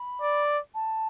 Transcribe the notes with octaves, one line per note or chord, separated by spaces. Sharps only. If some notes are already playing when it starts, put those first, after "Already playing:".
Already playing: B5
D5
A5